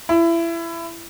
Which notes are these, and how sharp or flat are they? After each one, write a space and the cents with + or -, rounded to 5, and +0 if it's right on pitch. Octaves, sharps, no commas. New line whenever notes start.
E4 +25